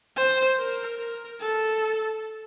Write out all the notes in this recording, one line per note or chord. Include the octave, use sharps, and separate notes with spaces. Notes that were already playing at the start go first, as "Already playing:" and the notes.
C5
A#4
A#4
A4